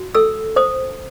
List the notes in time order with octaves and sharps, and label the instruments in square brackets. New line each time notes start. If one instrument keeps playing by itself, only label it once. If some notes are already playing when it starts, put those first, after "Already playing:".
Already playing: [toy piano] F#4
A4 E6
C5 D#6